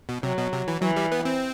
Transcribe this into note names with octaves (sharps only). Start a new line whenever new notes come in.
B2
C3 F#3
B2
C3
E3
E3 F#3
G3
B3
C4